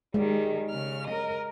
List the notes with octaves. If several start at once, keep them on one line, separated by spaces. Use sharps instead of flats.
D#3 G3 G#3
C#3 F6
A#4 D#5